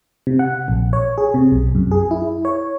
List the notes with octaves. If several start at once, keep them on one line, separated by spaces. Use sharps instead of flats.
C3
F#5
A#1
C#5
G#4
C3
B1
F#2
G#4
E4
C#5